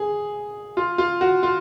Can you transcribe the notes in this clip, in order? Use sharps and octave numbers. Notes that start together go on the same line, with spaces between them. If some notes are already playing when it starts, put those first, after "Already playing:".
Already playing: G#4
F4
F4
F#4
F4